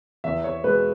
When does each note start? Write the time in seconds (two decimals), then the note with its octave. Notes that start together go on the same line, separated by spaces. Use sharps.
0.24 E2 E5
0.44 C#5
0.64 B2 G#3 B4